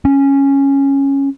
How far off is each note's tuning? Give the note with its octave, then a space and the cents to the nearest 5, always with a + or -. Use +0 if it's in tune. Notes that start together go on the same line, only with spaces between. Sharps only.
C#4 -5